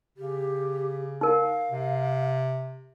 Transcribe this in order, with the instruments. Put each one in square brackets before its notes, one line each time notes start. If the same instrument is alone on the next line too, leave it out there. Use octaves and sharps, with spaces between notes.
[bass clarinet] C#3 [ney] G4
[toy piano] D#4 A#4 [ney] F5
[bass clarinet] C3